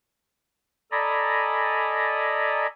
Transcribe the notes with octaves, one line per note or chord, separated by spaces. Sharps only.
A4 D5 D#5 G#5 A#5 B5